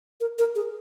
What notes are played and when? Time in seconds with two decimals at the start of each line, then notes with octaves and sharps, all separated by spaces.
0.21 A#4
0.39 A#4
0.55 G#4